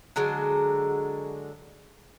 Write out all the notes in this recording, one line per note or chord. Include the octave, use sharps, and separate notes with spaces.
D3 F#3 G#3 F#4